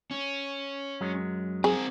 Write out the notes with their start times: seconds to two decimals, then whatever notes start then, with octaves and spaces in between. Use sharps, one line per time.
0.11 C#4
1.01 F#2 F#3 G#3
1.64 C4 G#4 A#4